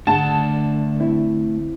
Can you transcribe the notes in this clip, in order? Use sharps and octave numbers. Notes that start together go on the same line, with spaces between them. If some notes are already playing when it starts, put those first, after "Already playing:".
D3 A3 F#5 A5
C4 E4